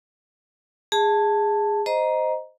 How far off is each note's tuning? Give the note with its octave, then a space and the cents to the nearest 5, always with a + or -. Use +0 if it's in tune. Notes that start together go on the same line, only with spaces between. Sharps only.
G#4 -15 A5 +0
C5 -10 D#5 +0 A#5 +15